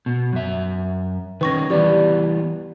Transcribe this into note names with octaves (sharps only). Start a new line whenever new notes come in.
B2
F#2 E5
D#3 C#4 B4 C#6 A#6
E3 G3 B3 G4 D5